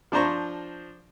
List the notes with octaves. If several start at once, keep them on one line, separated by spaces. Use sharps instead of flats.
F3 D4 C5 A#5 C#6